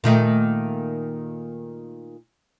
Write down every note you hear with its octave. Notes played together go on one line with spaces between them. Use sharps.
A#2 D#3 A3